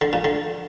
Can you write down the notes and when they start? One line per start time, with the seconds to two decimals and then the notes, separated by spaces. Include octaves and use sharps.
0.01 D3
0.13 A#2
0.24 D3